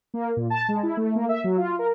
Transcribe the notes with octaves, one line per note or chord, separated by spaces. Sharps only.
A#3
A#2
A5
G#3
E4
A3
A#3
E5
F#3
F4
A#4